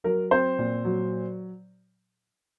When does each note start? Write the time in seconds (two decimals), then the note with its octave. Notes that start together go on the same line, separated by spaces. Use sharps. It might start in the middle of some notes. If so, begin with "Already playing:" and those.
0.04 F#3 A#4
0.31 C4 C5
0.59 A#2
0.85 F#3